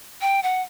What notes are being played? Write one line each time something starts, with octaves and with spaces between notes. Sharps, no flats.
G5
F#5